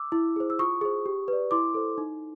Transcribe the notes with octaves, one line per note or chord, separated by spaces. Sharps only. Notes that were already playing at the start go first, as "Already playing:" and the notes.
Already playing: D6 E6
E4
G#4 C5
E6
F4 C#6 D#6
G#4 C5
G4
B4 D5
E4 C6 D6
A4 C5
D#4